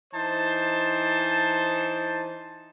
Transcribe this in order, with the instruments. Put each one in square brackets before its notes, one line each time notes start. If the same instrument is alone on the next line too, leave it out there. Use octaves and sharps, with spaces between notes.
[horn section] E3 D#4 C5 A5